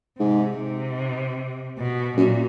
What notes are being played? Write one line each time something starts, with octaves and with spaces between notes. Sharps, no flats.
G#2 C3
C3
B2
F#2 A#2